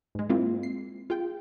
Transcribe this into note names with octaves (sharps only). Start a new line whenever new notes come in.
G#2 G#3
G#3 A#3 C4 E4 F4
C7
F4 G#4 G5